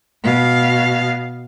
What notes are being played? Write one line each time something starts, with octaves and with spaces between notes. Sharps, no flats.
B2 F5